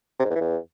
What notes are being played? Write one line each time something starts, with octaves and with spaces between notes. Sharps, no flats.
C3
G#2
E2
E3
E2